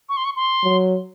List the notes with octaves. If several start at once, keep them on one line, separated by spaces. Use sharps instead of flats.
C#6
C6
C#6
C6
F#3